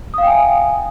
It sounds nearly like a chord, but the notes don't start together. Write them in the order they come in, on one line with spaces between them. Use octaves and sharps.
D#6 F5 G5 G#5 E5